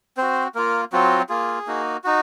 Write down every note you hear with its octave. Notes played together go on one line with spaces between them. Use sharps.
C4 F#4 C5
A#3 F4 A#4
F#3 C4 F4 F#4
A#3 F4 G#4
A#3 D#4 F#4
D#4 F#4